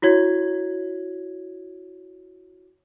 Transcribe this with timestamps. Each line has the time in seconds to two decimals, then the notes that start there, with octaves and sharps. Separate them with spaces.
0.02 E4 F#4 C#5 G#6